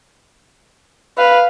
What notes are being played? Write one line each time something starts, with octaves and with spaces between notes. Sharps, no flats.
B4 F5